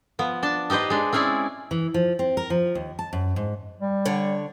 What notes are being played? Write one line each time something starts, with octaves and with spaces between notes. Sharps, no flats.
F3 B3
D4 A5
D#4 G4 B4 C5 D#5
G#3 D4
C4 C#4 E4 G#4 D5
E3
F3
C4
A#4
F3
D#2
A5
F#2
G#2
G3
D3 C#5